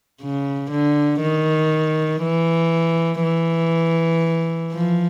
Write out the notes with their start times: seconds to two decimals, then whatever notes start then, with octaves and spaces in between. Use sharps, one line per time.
0.22 C#3
0.71 D3
1.21 D#3
2.22 E3
3.23 E3
4.73 F3